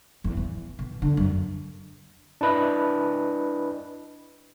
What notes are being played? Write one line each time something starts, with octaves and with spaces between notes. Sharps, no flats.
E2
E3
B2
D3
F#2
D4 E4 B4 D#5